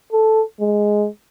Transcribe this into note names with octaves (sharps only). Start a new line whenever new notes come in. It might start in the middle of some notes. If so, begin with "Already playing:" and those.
A4
G#3